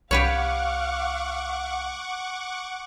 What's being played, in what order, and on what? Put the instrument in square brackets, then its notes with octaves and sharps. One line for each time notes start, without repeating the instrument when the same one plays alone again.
[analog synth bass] C2 [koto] G4 B4 C#5 [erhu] F5 [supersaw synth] F#5 C#6 D6